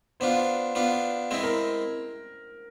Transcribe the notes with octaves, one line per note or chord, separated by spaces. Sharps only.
B3 D4 F4 C5
B3 D4 F4
G#3 C4 E4
A#4